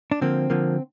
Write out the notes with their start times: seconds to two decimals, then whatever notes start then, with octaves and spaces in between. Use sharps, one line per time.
0.11 D4
0.21 D3 F3 A#3 C4
0.50 D3 F3 A#3